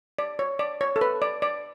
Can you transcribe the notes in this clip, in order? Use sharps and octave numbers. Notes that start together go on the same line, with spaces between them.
D5
C#5
D5
C#5
A4
B4
D5
D5